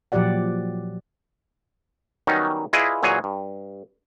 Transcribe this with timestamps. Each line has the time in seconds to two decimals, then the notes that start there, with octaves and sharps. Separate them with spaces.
0.12 A#2 F3 F#3 G4 D5 F#5
2.27 D#3 F#3 G3 B3 C#4 D#4
2.73 E4 F4 G#4 B4 D5 D#5
3.03 A#2 E3 F#3 G#4 C#5 G#5
3.24 G2